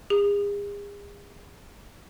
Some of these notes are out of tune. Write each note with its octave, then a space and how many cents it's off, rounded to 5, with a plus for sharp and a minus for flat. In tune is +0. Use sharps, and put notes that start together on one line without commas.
G#4 -40